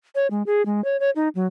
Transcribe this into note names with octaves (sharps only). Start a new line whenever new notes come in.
C#5
G#3
G#4
G#3
C#5
C#5
D#4
F#3